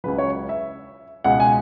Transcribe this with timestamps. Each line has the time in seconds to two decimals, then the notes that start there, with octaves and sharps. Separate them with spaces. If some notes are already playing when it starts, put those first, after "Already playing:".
0.04 C#2 C#3 F#3 B4
0.18 C#5
0.49 E5
1.24 C#2 B2 G#3 F#5
1.40 G#5